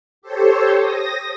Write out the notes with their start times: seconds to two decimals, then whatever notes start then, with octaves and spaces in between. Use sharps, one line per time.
0.22 G4 A4 C5 C#5
0.79 D#6 A#6